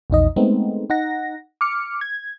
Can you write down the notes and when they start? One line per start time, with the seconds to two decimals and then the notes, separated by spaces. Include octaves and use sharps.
0.10 A#1 E2 D#4 D#5
0.36 G#3 A3 B3 C4 D#4
0.90 D#4 F#5 A#6
1.61 D6 F6 C#7
2.01 G#6